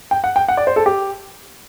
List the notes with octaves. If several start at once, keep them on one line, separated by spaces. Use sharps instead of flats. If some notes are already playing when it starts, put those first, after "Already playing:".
G5
F#5
G5
F#5
D5
C5
A4
G4